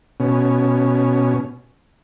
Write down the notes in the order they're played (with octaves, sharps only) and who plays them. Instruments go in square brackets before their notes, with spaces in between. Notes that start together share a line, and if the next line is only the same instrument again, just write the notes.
[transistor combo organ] B2 C#4